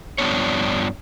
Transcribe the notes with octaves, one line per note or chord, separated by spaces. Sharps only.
G2 F3 G3 B3 D4 C#5